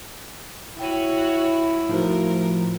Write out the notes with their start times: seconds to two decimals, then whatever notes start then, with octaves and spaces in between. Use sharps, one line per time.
0.79 E4 F#4 C#5 G5 D#7
1.89 A2 F3 D#4 F#4 A#4 C5